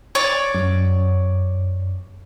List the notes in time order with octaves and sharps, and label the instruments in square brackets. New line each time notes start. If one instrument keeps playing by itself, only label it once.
[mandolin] C#5 D5
[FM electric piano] F#2